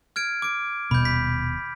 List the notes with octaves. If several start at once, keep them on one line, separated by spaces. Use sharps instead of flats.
F6 G#6 D7
D6 D7
D#1 B2 B5 G6
B6